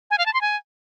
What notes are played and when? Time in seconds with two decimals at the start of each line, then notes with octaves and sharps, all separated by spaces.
0.11 G#5
0.18 F5
0.26 A5
0.34 C6
0.41 G#5